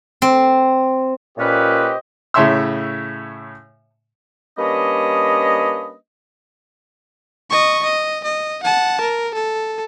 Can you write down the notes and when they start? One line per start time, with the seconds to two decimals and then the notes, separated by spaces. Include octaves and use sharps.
0.22 C4
1.38 A#2 C#4 G4 B4 C5 D#5
2.34 A2 C#3 C#5 E5 C6 E6
4.58 G3 A#3 C#4 D4 B4 D#5
7.50 D#5 C#6
7.83 D#5
8.24 D#5
8.63 F#5 A5
9.01 A#4
9.34 A4